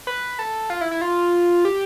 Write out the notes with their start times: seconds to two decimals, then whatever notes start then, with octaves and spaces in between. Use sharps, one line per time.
0.07 B4
0.39 A4
0.70 F4
0.81 E4
0.91 E4
1.01 F4
1.65 G4